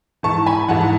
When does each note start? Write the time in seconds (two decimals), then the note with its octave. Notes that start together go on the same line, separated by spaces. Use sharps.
0.23 G#2 E3 A5 C#6
0.46 G#5 B5
0.68 G#2 E3 F#5 A5
0.80 A5